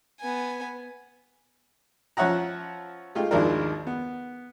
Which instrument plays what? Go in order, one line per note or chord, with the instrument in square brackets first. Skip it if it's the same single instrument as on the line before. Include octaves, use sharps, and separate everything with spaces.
[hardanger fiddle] B3 G#5
[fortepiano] F3 C#4 C#5 E5 F#5 A#5
G#3 A3 F4 G4
G#1 D#2 F3 G#3 D4 A#4
B3